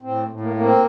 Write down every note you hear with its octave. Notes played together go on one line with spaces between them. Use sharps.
A2 C4
A2
A#3
A#3
C4